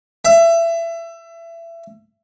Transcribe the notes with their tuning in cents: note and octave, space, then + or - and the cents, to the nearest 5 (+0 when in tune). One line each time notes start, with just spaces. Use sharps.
E5 +25